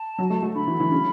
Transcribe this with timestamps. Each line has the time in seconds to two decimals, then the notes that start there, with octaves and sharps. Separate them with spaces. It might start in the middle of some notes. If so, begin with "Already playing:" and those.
Already playing: A5
0.18 F#3
0.30 A3
0.43 A3
0.55 D3 B5
0.67 E3
0.80 E3
0.92 C#3